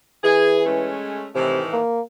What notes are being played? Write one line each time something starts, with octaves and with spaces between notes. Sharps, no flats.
E3 G#4
G#3 A3 C#4
A2 C3 D#3 E3
A#3